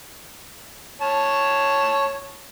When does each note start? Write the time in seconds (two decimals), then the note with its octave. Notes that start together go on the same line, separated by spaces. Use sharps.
1.02 C#5 A5